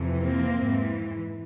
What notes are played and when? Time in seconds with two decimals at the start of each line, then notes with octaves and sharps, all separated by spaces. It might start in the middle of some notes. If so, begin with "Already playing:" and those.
Already playing: F2 C3 E3
0.20 A#3 C4
0.57 G#2 E3